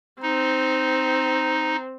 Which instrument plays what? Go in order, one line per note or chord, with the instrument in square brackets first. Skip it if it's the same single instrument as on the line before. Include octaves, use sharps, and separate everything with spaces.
[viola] C4 [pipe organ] D#4